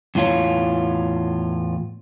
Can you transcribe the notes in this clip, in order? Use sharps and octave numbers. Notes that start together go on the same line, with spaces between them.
E2 A2 F4 C#5